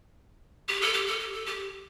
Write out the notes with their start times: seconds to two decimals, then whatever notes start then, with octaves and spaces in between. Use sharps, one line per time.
0.68 G4
0.81 A4
0.94 G4
1.07 A4
1.20 G4
1.32 A4
1.46 G4